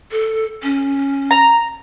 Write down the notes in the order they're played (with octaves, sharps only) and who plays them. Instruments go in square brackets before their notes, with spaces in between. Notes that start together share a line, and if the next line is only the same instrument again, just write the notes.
[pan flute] A4
C#4
[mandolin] A#5